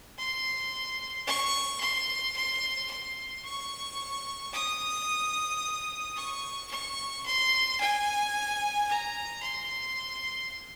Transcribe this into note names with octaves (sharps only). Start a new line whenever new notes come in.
C6
C#6
C6
C6
C6
C#6
D#6
C#6
C#6
C6
G#5
A#5
C6